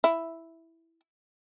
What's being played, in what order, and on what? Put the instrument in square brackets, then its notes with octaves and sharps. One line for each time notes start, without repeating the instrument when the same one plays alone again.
[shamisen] E4